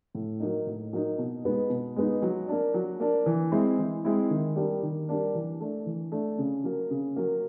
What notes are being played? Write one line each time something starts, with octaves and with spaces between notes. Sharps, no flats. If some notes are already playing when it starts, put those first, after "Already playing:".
A2
F#3 A#3 D#4
A2
F#3 A#3 D#4
B2
G#3 B3 D#4
B2
G#3 B3 D#4
F#3
A#3 D4
F#3
A#3 D4
E3
G#3 C4 E4
E3
G#3 C4 E4
D#3
G3 A#3 D4
D#3
G3 A#3 D4
E3
A3 D4
E3
A3 D4
C#3
F#3 A#3
C#3
F#3 A#3